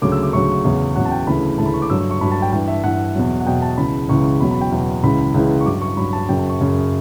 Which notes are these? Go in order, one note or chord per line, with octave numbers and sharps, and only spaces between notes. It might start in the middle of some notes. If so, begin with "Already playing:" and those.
D2 C#3 F#3 D6
E6
D6
D2 C#3 F#3 C#6
E2 C#3 F#3
E2 C#3 F#3 F#5
A5
G5
D2 C#3 E3 B5
D2 C#3 E3 A5
B5
C#6
D6
G2 F#3 E6
C#6
C#6
G2 F#3 B5
A5
G5
G2 E3 G5
E5
G2 E3 F#5
E2 B2 F#3
F#5
E2 B2 F#3 G5
A5
C#2 C#3 E3 B5
C#2 C#3 E3 C#6
E2 B2 F#3 B5
B5
G5
E2 B2 F#3
C#2 C#3 E3 B5
C#2 C#3 E3
C#6
G2 F#3 D6
C#6
G2 F#3 B5
A5
F#2 C#3 F#3 G5
A5
C#6
F#2 C#3 F#3